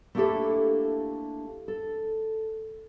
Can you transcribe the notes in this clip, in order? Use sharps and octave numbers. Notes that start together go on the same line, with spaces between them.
A3 A#3 D4 E4 G4 A4
A4